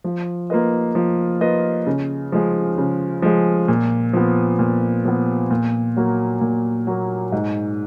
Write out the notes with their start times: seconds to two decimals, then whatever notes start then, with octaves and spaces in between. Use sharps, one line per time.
0.04 F3
0.50 A#3 F4 B4 D#5
0.95 F3
1.41 A#3 F4 B4 D#5
1.87 C#3
2.32 F3 G#3
2.78 C#3
3.22 F3 G#3
3.68 A#2
4.13 F3 B3
4.59 A#2
5.05 F3 B3
5.51 A#2
5.97 F#3 A#3
6.41 A#2
6.87 F#3 A#3
7.32 G#2